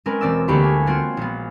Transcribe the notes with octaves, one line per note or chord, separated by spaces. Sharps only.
G#3 C4 C#4 A#4 B4
E1 C4 D5 E6
D2 A#3 G4 B5 C#6 C#7
G#5
B3 C4 F4 F#4 C#5
A#1 B3